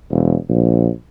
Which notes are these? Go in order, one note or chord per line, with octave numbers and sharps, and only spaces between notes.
E1
A#1